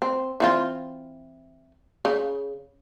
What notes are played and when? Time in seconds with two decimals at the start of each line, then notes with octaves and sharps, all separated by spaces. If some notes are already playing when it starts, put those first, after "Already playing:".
0.02 C4
0.40 E3 C4 F4
2.05 C#3